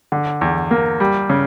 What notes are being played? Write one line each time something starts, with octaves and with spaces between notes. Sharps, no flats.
D3
E2
A#3
G3
C#3